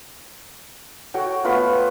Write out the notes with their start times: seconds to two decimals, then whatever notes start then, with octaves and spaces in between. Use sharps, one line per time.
1.14 F#4 A4 C#5 G5
1.44 A3 B3 F4 B4